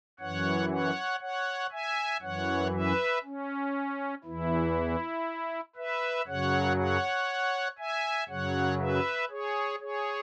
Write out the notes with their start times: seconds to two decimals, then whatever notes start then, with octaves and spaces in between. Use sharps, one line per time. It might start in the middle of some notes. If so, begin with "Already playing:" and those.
0.20 F#2 E3 C#5 F#5
0.71 C#5 F#5
1.21 C#5 F#5
1.72 E5 G#5
2.22 F#2 E3 C#5 F#5
2.73 B4 E5
3.23 C#4
4.24 E2 E3 E4
5.76 B4 E5
6.27 F#2 C#3 F#3 C#5 F#5
6.77 C#5 F#5
7.78 E5 G#5
8.29 F#2 C#3 F#3 C#5 F#5
8.80 B4 E5
9.30 G#4 C#5
9.80 G#4 C#5